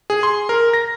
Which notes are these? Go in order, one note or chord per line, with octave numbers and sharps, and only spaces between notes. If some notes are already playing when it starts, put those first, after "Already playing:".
G#4
C6
A#4
A#6